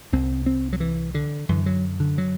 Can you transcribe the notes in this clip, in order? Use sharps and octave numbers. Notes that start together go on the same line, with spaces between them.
C2 C3 C4
C4
F#3
E3
D3
F#2 D3 E3
F#3
D3
F#3